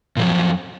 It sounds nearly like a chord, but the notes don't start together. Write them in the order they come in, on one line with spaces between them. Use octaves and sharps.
A#2 F3 F#3 F2